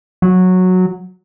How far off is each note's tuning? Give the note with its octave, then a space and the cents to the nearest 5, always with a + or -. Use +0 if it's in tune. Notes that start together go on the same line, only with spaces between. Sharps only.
F#3 -10